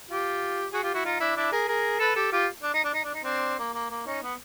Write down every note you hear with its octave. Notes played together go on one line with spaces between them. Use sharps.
F4 G4
F#4 G#4
F4 G4
E4 F#4
D#4 F4
D4 E4
D4 E4
G#4 A#4
G#4 A#4
A4 B4
G4 A4
F4 G4
D4
D#4
D4
D#4
D4
D#4
C4 D4
A#3
A#3
A#3
C#4 D#4
B3